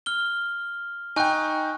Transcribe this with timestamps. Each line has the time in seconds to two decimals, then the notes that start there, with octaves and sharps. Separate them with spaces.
0.06 F6 G7
1.16 D#4 G5 G#5 C#6 F#6